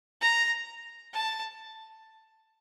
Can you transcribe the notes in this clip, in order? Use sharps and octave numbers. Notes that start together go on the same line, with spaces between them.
A#5
A5